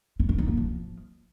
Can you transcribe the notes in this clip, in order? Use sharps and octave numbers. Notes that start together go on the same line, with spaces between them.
E4
D4
D#4
A#3
F3